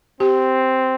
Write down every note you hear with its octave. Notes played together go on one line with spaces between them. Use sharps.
C4 G4